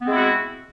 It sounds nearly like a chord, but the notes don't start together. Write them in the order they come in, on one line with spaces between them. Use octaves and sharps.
B3 C4 G#3 E4 F#4